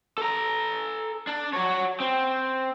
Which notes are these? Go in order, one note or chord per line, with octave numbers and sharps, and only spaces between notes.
A4 A#5
D4
F#4 C#5
C4